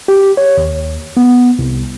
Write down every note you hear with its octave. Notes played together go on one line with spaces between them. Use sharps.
G4
C#5
D#2
B3
C2